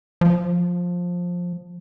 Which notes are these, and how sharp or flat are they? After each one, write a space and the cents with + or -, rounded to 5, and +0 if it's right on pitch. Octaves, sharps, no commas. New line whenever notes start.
F3 +15